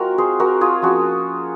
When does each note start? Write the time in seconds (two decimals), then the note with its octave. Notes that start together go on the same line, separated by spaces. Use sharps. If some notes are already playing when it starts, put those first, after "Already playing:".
Already playing: G#3 C4 F4 F#4 A#4
0.18 G#4 C5
0.40 F#4 A#4
0.61 F4 G#4
0.82 F3 A#3 C#4 F4 F#4